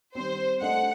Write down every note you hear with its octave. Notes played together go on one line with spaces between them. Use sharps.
D#3 G3 C4 C5
A3 D4 A4 D#5 F#5